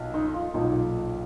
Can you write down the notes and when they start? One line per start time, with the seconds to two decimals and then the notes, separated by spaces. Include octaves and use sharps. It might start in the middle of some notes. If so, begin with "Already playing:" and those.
Already playing: B1 A#2
0.14 D#4
0.34 F4
0.54 B1 A#2 D#4